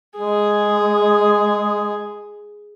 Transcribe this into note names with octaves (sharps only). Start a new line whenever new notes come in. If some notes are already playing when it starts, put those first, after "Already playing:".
G#3 G#4